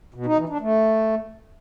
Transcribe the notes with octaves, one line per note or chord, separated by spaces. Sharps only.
B2
D#4
E3
D4
A3